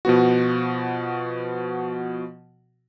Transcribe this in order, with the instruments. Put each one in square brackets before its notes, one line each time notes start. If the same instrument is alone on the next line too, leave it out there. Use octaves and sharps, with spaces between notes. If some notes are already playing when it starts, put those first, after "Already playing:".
[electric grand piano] B2 F3 B3 F#4